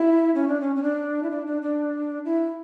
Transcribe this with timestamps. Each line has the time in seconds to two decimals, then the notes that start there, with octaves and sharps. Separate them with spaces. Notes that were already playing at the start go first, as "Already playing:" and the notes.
Already playing: E4
0.35 C#4
0.48 D4
0.60 C#4
0.76 C#4
0.83 D4
1.23 E4
1.30 D4
1.46 D4
1.62 D4
2.25 E4